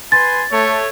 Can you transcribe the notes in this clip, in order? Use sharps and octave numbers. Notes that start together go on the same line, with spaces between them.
B4 G#5 C6 A6
A3 C#5